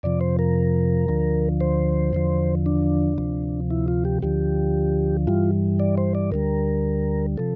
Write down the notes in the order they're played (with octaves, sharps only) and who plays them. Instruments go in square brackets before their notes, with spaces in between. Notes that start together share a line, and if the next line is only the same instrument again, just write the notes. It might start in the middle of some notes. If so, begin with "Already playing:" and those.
[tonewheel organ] F2 C3 F3 D5
C5
A#4
D2 D3 F3
C5
E2 D3 F3
D4
D2 C3 F3
E4
F4
G4
D2 D3 F3 G4
G2 E3 G3 F4
D5
C5
D5
D2 D3 G3 A#4
C3 F3 A4